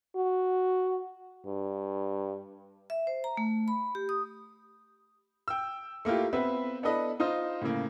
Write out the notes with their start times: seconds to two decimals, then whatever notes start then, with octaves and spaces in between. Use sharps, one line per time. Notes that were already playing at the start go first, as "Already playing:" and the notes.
0.16 F#4
1.46 G2
2.90 E5
3.07 C5
3.24 A#5
3.37 A3
3.68 B5
3.95 G4
4.09 D#6
5.48 G5 E6
6.05 A3 A#3 E4 F4 G4
6.33 B3 C4 B4 E5
6.83 B3 D4 E4 A4 B4 D#5
7.20 D#4 F4 C5 D#5
7.61 A2 C#3 A#3